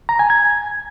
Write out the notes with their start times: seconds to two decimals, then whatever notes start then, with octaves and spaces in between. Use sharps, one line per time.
0.09 A#5
0.19 G#5
0.30 G#6